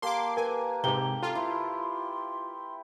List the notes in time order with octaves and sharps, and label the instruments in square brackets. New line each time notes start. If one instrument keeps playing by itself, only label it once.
[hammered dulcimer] A#3 G4 A5 [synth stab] C6 D6
[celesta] A#4 [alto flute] B4 [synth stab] G#5
[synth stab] G#2 C3 [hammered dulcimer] G4 [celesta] A#5 G7
[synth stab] F4 [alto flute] A4 [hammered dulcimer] A5 C6
[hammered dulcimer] E4 B4 [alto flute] C6